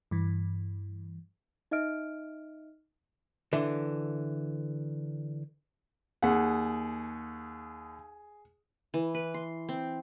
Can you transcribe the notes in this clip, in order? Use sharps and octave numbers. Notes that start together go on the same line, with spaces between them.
G2 E3
D#4 D#5 E5 F6 D7
D3 E3
D#2 G#4 F#5
E3
B4
C6
C4